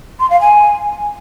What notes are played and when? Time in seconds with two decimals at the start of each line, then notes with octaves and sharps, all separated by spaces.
0.20 C6
0.30 F5
0.41 G#5